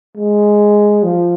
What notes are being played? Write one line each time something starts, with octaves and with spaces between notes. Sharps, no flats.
G#3
F3